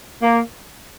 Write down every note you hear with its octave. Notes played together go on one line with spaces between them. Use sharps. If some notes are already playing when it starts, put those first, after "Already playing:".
A#3